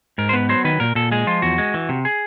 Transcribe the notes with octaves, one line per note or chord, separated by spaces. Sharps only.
G#2 A#4
C5
B3 B4
F#3 C5
D#3 B4
A#2 A#4
A#2 A4
G#3 G#4
F3 F4
E2 F#4
G#3
E3
C3
G#4